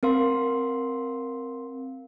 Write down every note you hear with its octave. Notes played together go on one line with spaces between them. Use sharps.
C4 A#4 F5 C6